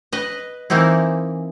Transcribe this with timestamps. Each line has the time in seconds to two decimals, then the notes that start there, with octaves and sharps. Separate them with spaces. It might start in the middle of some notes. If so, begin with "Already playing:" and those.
0.12 B4 D#5
0.70 E3 A#3 C4 D#4 E4